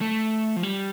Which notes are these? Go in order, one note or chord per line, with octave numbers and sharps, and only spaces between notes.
A3
F3
G3